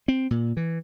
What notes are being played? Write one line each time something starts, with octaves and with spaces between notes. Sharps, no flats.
C4
A#2
E3